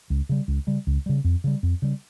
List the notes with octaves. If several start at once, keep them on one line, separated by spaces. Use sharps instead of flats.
C#2
C#3 G3
C#2
C#3 G3
C#2
C#3 G3
F2
C#3 G3
F2
C#3 G3